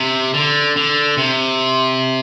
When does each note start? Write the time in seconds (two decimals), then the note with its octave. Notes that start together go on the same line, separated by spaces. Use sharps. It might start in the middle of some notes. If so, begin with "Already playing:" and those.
Already playing: C3
0.34 D3
0.76 D3
1.18 C3